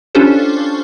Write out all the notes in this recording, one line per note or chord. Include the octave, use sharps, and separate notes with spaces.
C#4 D4 F4 G4 A4 C5